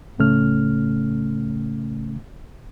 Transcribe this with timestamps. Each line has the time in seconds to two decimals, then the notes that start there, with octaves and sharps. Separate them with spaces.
0.18 C#2 A2 C#3 A3 C#4 F6